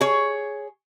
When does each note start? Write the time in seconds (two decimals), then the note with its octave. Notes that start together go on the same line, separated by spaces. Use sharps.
0.01 G#4 C#5